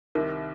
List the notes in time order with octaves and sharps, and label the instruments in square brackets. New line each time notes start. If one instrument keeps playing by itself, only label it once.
[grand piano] C2 C3 D#3 [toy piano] A#4